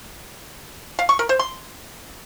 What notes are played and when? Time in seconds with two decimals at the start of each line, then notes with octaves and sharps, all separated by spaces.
0.99 F5
1.09 C#6
1.19 A#4
1.29 C5
1.39 C6